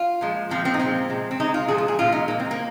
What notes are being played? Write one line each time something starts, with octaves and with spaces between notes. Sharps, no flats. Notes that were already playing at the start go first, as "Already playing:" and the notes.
Already playing: F4
A#2 F3 G#3
A#2 F3 G#3 C4
C4
D#4
A#2 F3 G#3 C4
C3 G#3
C4
C3 G#3 D#4
F4
A#2 F3 G#3 G#4
F4
G#4
A#2 F3 G#3 F4
D#4
A#2 G#3 A#3
C4
A#3